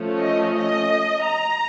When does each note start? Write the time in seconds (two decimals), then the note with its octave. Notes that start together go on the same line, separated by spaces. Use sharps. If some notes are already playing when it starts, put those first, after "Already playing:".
Already playing: F3 A3 C#4
0.19 D#5
0.55 D#5
1.25 A#5